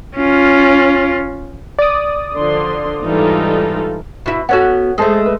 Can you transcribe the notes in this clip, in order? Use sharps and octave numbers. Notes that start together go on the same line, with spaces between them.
C#4 F4
D5 D#6
D3 F3 C6
G#2 E3 G3 D#4 F4 A4
B2 E4
B3 C#4 F#4 A4 C#5 F#5
G#3 A3 G#4 A4 C5
B4